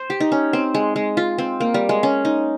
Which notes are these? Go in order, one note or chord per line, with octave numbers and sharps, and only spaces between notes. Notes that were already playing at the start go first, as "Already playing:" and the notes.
Already playing: C5
G4
D#4
C#4
C4
G#3
G#3
F4
C4
A#3
G3
G#3
C#4
D#4